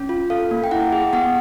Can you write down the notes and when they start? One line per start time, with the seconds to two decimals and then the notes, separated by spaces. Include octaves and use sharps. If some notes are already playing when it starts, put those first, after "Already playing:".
Already playing: C#4
0.09 F4
0.30 A4 F5
0.51 A#3
0.64 G5
0.71 E4 F#5
0.92 G#4
1.13 B3 F#5